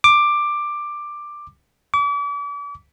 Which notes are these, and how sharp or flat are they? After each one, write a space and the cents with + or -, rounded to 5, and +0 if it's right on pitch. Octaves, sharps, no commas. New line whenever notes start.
D6 +10
D6 -40